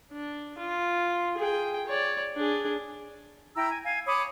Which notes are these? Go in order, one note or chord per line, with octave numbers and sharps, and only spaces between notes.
D4
F4
G#4 G5
C#5 D5
D4 G#4
E4 G5 A#5 E6
G#5
F5 G#5
C#5 B5 D6 D#6